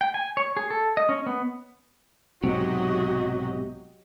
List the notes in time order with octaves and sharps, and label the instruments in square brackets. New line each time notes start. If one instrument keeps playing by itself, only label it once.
[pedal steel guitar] G5
G#5
C#5
G#4
A4
D#5
C#4
B3
[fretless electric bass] B1 G#2 [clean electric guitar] C3 [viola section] F#3 G4 D#5 [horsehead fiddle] F#4